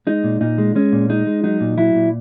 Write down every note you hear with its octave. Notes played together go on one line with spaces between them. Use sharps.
G#3 D#4
A#2
A#2 D#4
G#3
G#3 C#4
A#2
G#3 D#4
G#3
F#3 D#4
A#2
F#3 E4
A#2